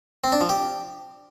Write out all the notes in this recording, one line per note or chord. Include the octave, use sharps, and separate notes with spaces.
C4
D4
F3
G4